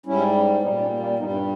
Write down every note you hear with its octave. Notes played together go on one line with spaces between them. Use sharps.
G#2 G3 C#4 E4
A#2 G3 B3 D#4
A#3 C#4
A#3 C#4
G2 G3 B3 D#4
C#4 E4